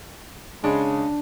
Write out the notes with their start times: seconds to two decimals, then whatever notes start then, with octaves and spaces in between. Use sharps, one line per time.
0.64 C#3 G#3 D4